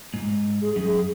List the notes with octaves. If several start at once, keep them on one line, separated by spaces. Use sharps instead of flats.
G#2
G#4
F#2 G#4
G#4